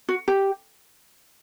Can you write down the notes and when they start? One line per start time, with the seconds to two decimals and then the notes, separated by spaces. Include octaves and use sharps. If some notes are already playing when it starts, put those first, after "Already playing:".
0.09 F#4
0.28 G4